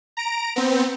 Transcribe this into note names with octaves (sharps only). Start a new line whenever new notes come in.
A#5 D7
B3 C4